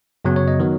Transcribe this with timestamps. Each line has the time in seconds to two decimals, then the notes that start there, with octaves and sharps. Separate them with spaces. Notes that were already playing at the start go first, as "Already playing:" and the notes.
0.25 F#2 C#3 F#3 B3
0.36 C#5
0.48 D#5
0.60 D#3 F#3 B3